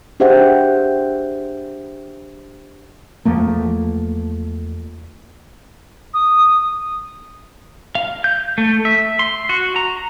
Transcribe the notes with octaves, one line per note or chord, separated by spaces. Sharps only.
D4 G4 G#4 C5 E5 F#5
E2 F3 A3 A#3
D#6
F5
G6
A3
E5
C6
F#4
A#5